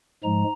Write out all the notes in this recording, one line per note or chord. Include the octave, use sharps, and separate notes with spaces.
G#2 F3 G#3 A#5